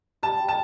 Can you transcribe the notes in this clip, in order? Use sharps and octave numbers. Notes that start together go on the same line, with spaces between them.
G3 A5
G3
A5